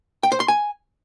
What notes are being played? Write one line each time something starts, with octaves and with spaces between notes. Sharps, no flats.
G5
C5
C6
G#5